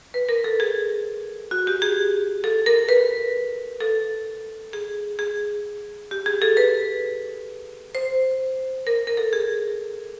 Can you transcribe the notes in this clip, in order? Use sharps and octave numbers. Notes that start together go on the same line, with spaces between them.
B4
A#4
A4
G#4
F#4
G4
G#4
A4
A#4
B4
A4
G#4
G#4
G4
G#4
A4
B4
C5
A#4
A#4
A4
G#4